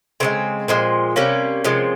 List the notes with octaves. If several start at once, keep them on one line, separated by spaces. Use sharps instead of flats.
C#3 E3 G#3 C4
A#2 F3 G#3
C3 G3 A#3 C#4
C3 F3 G#3